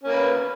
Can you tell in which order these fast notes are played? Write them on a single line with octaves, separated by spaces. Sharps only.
C#4 A#3 B4